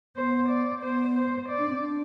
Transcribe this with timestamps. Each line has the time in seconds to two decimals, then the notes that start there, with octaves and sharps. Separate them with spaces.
0.16 B3 C5
0.49 D5
0.82 B3 C5
1.15 C5
1.49 D5
1.58 D4
1.69 C4
1.80 D4